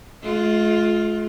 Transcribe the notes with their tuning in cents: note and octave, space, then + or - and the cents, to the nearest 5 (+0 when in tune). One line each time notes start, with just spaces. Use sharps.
G#3 +45 F4 +0